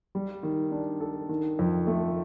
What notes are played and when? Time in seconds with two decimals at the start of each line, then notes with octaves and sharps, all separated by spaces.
0.15 G3
0.43 D#3
0.72 D4
1.00 A4
1.29 D#3
1.59 F2
1.87 A3